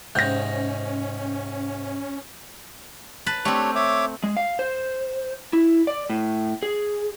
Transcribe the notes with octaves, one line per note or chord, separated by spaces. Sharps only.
G#2 C3 G#3 C#4 G6 A#6
B4 A5 B5
A3 C4 D4 G4 C#5
C#5 E5 D6
G#3
F5
C5
E4
D5
A2
G#4